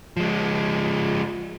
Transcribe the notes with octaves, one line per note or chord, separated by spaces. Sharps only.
F3 G#3